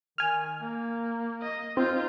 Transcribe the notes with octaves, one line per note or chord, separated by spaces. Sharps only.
D#3 G#5 F6
A#3
D#5
C4 D#4 F4 G6